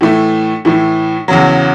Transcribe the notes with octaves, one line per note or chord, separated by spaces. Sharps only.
A2 E3 A3
A2 E3 A3
E2 C#3 F#3